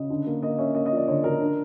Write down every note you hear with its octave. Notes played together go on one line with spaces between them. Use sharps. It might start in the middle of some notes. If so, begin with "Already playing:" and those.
Already playing: C#3 D#5
D3
A#3
A#3 D#5
C#4 E5
A#3 D#5
D#5
F3
D5
D3 C#5
D3 A#4
D4